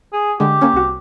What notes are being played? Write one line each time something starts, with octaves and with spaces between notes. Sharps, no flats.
G#4
D3 G#3 G4
A#3 C#4
C2 F#4